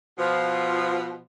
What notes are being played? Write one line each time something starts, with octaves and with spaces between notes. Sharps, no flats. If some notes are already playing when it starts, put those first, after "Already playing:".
B2 F3